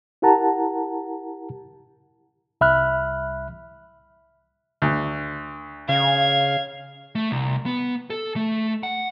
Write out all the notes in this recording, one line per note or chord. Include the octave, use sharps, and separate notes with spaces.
E4 G4 A#4 F#5 A5 A#5
C2 E5 B5 F6 F#6
D2
C#3 F5 G#6
A3
C2
B3
A4
A3
F#5